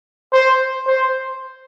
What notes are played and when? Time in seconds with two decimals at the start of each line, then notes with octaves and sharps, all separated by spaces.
0.33 C5
0.87 C5